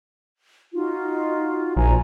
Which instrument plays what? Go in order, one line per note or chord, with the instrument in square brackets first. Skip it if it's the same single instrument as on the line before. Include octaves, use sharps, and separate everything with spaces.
[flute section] D#4 F4 F#4
[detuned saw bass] A#1 [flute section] G#5 A#5